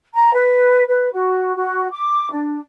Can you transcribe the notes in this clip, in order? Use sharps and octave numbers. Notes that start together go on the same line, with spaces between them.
A#5
B4
B4
F#4
F#4
D6
D4